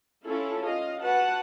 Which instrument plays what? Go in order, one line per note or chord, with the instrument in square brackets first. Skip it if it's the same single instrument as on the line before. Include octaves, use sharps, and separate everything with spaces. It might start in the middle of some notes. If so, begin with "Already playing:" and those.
[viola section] C#4 E4 F4 A4
F4 D#5 F5
F#4 B4 F#5 A5